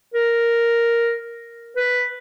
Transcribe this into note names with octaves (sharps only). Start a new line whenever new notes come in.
A#4
B4